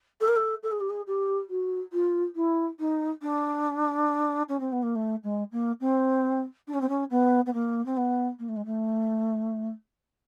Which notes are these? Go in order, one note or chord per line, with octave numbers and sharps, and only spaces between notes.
A4
A#4
A4
A4
G#4
G4
G#4
G4
F#4
F4
E4
D#4
D4
C#4
C4
B3
A#3
A3
G#3
A#3
C4
D4
C#4
C4
C#4
B3
B3
A#3
C4
B3
A#3
A3
G#3
A3